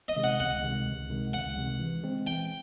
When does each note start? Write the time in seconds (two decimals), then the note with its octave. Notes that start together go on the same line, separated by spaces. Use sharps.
0.08 D#5
0.16 C3 D#3 G#3
0.24 F#5
0.40 C#2 F#5
0.63 C3 D#3 G#3
0.86 C#2
1.09 C3 D#3 G#3
1.33 C#2 F#5
1.57 C3 D#3 G#3
1.80 E3
2.03 G#3 C4
2.26 E3 G5